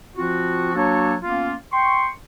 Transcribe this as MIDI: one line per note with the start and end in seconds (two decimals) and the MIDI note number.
0.16 0.72 53
0.16 0.72 60
0.16 0.72 65
0.16 0.72 66
0.75 1.15 54
0.75 1.15 58
0.75 1.15 62
0.75 1.15 66
0.75 1.15 69
0.75 1.15 73
1.22 1.53 58
1.22 1.53 59
1.22 1.53 61
1.22 1.53 65
1.72 2.07 79
1.72 2.07 84
1.72 2.07 85